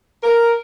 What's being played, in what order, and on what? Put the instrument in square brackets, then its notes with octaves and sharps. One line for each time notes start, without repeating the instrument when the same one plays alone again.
[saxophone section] A#4